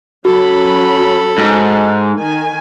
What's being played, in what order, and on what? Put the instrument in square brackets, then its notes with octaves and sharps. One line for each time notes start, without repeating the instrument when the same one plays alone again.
[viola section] F#3 C#4 B5 [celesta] F#4 [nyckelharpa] A4
[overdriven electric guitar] G#2
[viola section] D#3 G#5